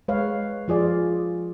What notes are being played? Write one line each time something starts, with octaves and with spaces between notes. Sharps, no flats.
G#3 B4 C#5 F5
F3 F4 G#4 D5